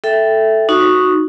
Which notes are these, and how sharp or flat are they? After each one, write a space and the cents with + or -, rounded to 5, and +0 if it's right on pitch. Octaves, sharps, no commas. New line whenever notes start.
A4 +0 E5 +0 G5 +0
D#4 +0 F#4 -10 C#6 +0